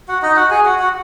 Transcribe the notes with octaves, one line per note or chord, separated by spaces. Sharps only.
F#4 F#5
D#4 D#5
F#4 F#5
G#4 G#5
F#4 F#5
F#4 F#5